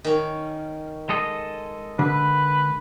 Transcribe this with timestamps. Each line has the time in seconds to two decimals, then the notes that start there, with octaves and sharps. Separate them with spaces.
0.04 D#3 C#4
1.09 G#3 A4 D#5
1.99 D3 B4